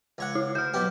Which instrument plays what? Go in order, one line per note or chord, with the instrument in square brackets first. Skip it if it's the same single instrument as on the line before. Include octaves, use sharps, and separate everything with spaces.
[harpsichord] C#2 C#5 F#5
[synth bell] E4
[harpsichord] D2 [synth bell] F6 G6
[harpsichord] B1 B2 G4